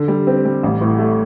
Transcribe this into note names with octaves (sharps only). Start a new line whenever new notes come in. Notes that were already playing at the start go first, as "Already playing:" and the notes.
Already playing: D3
G3
C4
G3
A1
A2
A3